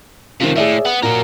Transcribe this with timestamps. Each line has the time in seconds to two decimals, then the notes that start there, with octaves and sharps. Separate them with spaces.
0.40 C3 D#3 F3 F4
0.56 A2 G#4 D5 E5
0.85 B3
1.03 A#2 F#4 A#4